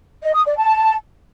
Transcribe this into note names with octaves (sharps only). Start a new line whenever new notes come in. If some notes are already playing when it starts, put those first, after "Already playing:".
D#5
D#6
D5
A5